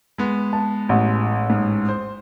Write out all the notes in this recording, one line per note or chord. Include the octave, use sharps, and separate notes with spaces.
G#3 B3
A5
A1
G#2
C5